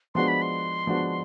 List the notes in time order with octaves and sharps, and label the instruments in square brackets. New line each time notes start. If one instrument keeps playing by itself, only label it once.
[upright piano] F3 G#3 B3 D4 F#4 [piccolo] C6
[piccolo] B5
C6
[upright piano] F3 G#3 B3 D4 F#4